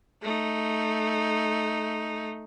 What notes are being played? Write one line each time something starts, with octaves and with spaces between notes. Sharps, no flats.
A3 D#4